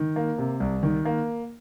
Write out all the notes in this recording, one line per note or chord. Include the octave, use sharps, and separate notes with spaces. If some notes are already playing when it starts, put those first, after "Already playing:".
Already playing: D#3
A#3
C3
C2
D#3
A#3